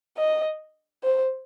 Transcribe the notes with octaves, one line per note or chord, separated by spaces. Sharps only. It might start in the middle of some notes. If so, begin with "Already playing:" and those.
D#5
C5